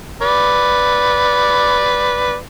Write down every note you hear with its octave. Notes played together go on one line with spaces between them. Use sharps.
B4 D5